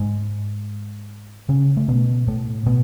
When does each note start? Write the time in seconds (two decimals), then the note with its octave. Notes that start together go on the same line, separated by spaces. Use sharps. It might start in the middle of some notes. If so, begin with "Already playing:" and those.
Already playing: G#2 G#3
1.49 C#3 C#4
1.77 A3
1.88 B2 B3
2.27 A2 A3
2.66 B2 B3